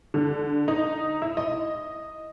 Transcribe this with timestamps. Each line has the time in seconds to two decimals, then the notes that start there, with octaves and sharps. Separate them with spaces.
0.14 D3
0.68 D#4
1.22 E4
1.37 D#5